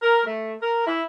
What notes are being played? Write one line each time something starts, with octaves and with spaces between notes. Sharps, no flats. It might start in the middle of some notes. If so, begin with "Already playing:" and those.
A#4
A3
A#4
E4